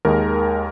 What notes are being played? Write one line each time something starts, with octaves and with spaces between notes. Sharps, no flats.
D#2 D#3 G#3 A#4